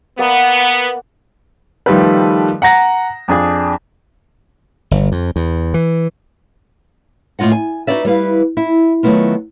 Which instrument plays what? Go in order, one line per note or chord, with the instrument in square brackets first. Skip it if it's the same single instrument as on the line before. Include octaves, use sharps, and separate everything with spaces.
[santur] A#3 D5 F#5 [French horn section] B3
[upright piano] D#3 F3 G3 A3 A4 B4
F#5 A#5 A#6
F2 D4 G#4
[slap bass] G1
F2
E2
E3
[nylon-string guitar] A2 D4 F4 D#5 F#5
G#5
D#4 E4 F#4 B4 D5 E5
G3 E4 B4 F5
E4
D#3 F#3 A3 B3 E4 F4